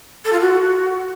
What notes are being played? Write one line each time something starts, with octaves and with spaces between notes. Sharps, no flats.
A4
F4
F#4